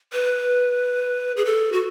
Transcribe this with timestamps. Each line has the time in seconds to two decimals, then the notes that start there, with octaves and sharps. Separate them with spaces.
0.13 B4
1.37 G#4
1.45 A4
1.72 F#4